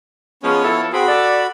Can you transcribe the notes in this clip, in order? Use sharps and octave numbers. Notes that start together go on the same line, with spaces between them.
F3 G#3 B3 C#4 C#5
F3 E4 A4
C4 F#4 G#4 B5
A4 D5